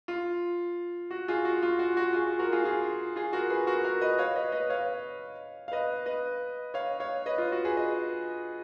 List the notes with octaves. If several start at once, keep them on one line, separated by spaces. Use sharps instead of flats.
F4
F#4
F4 G#4
F#4
F4
F#4
F#4
F4 G#4
F#4
F#4 A#4
F4 G#4
F4 G#4
F4 G#4
F#4 A#4
G#4 B4
F#4 A#4
F#4 A#4
B4 D#5
C#5 F5
B4 D#5
B4 D#5
C#5 F5
F5
B4 D#5
B4 D#5
C#5 F5
C#5 F5
B4 D#5
F4
F#4
G#4 B4
B4 D#5